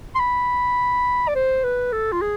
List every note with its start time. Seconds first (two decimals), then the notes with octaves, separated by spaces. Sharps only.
0.15 C6
0.19 B5
1.28 D5
1.35 C5
1.64 B4
1.92 A4
2.12 F4
2.22 G#4